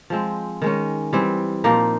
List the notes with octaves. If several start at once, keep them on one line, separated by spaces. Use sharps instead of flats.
F3 G#3 C4
D#3 G#3 C#4
E3 G3 C4
A#2 F3 A#3 D#4